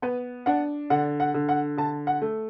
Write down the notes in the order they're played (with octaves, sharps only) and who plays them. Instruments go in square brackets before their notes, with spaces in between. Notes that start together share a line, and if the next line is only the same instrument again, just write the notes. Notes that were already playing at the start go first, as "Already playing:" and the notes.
[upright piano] B3 B4
D4 F#5
D3 F#5
F#5
D3
F#5
D3 A5
F#5
A3